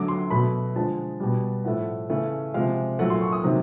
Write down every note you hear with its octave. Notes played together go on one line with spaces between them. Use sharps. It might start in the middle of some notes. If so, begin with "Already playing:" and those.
Already playing: D3 F#3 A3 D6
C6
B2 F#3 A3 B5
D3 F3 G#3 A5
B2 G3
A2 F3 A3 F#5
C#3 E3 A3
C3 F3 G#3 F5
A#2 F#3 A3 F#5
C6
C#6
D#6
C3 D#3 F#3